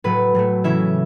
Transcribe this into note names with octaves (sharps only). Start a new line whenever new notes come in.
A2 F#3 A3 B4
A2 F#3 A3
C#3 E3 C#4 E4 E5